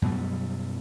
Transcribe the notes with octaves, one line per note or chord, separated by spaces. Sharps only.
F#2 B2 F#3 G3